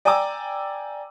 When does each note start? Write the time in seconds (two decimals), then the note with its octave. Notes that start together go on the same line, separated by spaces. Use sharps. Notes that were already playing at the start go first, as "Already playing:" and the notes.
0.05 D5 G5 G#5 A#5 D6 E6